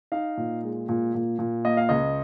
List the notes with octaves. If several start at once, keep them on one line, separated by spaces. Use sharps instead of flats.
D#4 F5
A#2
G#3
A#2
A#2
A#2
A#3 D#5
F5
C#2 D#5